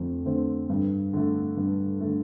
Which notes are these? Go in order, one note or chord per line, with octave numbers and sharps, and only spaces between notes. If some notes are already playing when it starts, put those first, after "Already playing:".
Already playing: F2 D3 A3 C4
D3 A3 C4
G2
D3 A3
G2
D3 A3